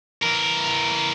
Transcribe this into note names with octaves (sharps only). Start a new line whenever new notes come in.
E3 A#4